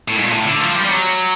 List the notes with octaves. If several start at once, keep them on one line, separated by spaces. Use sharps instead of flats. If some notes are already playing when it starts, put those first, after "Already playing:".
A2
G#2
A#2
A2
D3
F3
G3
G3
F#3